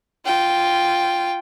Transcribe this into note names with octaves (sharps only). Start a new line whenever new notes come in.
F4 G5